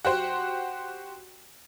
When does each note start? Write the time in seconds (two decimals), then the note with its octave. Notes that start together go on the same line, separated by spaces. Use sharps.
0.05 F#4 G4 C5